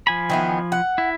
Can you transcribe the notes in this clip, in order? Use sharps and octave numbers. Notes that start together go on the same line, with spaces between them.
F3 G#5 B5
D#3 E3 B3
F#5
E4